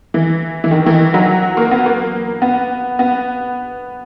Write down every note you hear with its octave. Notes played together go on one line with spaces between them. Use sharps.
E3
E3
D#3
E3
F#3
A#3
B3
A#3
B3
B3